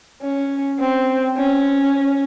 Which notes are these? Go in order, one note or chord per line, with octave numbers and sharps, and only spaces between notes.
C#4
C4
C#4